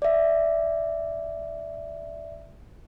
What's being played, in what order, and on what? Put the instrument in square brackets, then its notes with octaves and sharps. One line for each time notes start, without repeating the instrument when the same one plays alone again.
[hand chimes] D5 E5